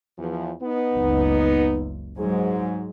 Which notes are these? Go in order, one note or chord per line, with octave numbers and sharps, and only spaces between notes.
E2 F3
B3 D#4
F#1 C#2
G#2 F#3 G#3